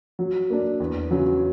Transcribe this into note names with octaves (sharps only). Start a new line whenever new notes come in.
F#3
A#3 D4
E2
C#3 F#3